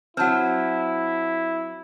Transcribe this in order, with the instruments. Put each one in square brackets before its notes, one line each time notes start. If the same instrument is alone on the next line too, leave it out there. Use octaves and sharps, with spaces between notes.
[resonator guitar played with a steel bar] F#3 C4 [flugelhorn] E4 [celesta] F#5 A5 F6